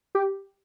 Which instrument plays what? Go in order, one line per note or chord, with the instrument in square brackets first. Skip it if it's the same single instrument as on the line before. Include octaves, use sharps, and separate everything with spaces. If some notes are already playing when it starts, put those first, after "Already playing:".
[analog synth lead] G4